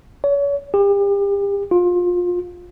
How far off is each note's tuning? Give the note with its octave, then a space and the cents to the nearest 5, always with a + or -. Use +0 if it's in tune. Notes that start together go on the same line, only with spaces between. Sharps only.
C#5 +35
G4 +35
F4 +25